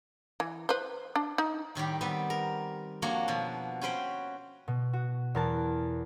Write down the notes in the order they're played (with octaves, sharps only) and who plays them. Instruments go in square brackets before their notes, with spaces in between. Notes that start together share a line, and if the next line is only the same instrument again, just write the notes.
[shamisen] E3
B4 C5
D4
D#4
[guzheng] A2 D#3 G3 G4
G3 B3 C4 B4
A#4
F2 A#3 D4 F#4 C#5
B2 F3
C#4 F#4 B4 C5 G5 B5
[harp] B2
F#4
E2 A#4 A5